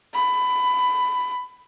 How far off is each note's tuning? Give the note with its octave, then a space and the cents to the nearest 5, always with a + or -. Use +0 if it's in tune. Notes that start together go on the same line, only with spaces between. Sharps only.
B5 +20